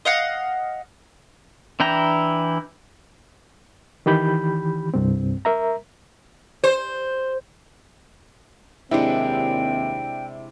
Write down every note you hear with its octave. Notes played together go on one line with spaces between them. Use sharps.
D#5 F5 F#5
E3 D4 E4 G5 A#5
D#3 E3 G4 B5 G6
C2 G2 C4
A#4 E5 A#5
C5
D#2 C3 G#3 C4 D4 E4 G5